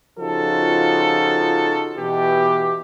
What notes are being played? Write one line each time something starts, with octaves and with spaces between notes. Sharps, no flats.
C#3 F3 D#4 F4 F#4 A4
B2 E3 G4